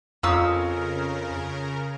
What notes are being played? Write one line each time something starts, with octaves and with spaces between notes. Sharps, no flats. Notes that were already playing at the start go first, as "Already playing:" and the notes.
F2 C#3 C#4 F4 A#4 A#5 D#6 E6